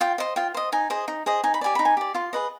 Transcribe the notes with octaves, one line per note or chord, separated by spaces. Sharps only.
F4 G5
C5 D#5
F4 G5
C5 D#5
D#4 G#5
G#4 C5 D#5
D#4
G#4 C5 D#5
D#4 G#5
B5
G4 D5 G#5
D#4 B5
G#5
G4 D5
F4 C6
G#4 B4 D#5